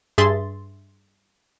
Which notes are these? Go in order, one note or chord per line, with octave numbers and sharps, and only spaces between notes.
G2 G#4 E5 C6 A6